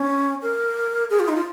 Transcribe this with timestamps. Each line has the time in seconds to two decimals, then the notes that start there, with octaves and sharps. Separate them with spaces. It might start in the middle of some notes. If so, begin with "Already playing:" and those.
Already playing: C#4
0.42 A#4
1.10 G#4
1.20 F4
1.28 D#4
1.36 F4